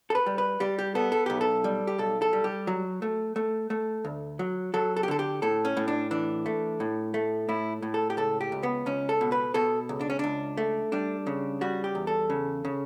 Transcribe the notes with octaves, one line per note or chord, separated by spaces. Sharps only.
A4
B4
G3
B4
G3 G4
G4
B3 A4
A4
B1 G4
A4
G3
G4
B1 A4
A4
G3
G4
F#3
A3
A3
A3
D2
F#3
F#3 A4
A4
G4
D3 A4
G4
A2 A4
C#4
A2
D4
E3 D4
A3
A2
A3
A2 E4
A2
A4
G4
C#2 A4
G4
C#2
B3
C#2 C#4
A4
B2
B4
B2 A4
C#2
D4
C#4
C#2 D4
A3
G3 D4
C#3
G3 F#4
G4
E2
A4
C#3
C#3